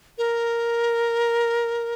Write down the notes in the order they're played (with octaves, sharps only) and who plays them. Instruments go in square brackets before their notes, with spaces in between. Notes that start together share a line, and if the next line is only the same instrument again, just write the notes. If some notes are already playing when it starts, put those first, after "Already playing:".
[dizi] A#4